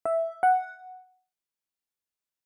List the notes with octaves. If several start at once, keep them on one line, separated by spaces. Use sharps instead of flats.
E5
F#5